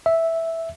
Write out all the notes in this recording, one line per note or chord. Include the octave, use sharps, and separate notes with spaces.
E5